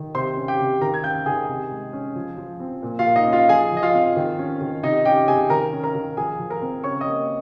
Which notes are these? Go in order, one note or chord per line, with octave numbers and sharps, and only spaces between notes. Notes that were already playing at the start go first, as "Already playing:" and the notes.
Already playing: D#3
C3 C5 C6
C#4
G4 G5
C3
D#3 A#4 A#5
G#6
C#4 G5 G6
D#3 G#4 G#5
C3
G#3
C#4
F3
F3
C4
A#2
F4 F5
A#3
D#4 D#5
C#4
F4 F5
F3 G#4 G#5
F3
D#5
F4 F5
C4
D#3
C#4
D#3
C3 D#4 D#5
C#4 G4 G5
C3 G#4 G#5
D#3 A#4 A#5
C#4
A#4 A#5
D#3
F3 G#4 G#5
F3
A#4 A#5
C4
C#3 C#5 C#6
D#5 D#6
A#3